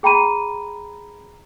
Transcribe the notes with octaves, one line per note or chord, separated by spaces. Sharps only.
G#4 G5 A#5 B5 D#7